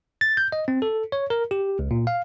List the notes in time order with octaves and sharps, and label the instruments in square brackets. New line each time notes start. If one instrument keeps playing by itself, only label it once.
[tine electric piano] A6
G6
D#5
C4
A4
C#5
A#4
G4
C#2
A#2
F5